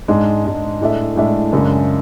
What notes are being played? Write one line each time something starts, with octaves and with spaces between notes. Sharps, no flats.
G#2 G#3 D4
G#2 G#3 D4
A2 G#3 D4 A4 E5
A2 G#3 D4 A4 E5
F#2 C#3 G#3 D4